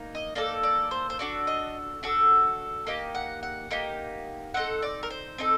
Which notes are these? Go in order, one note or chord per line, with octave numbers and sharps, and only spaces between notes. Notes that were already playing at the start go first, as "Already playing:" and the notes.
Already playing: A#3 D#4
D#5
A#3 D#4 A4 D5
D5
C5
C5
D4 F#4 A4 D5
D#5
D4 F#4 A4
A#3 D#4 G4 D#5
F#5
F#5
A#3 D#4 G4
C4 D#4 A4 F#5
D5
A#4
C5
C4 D#4 A4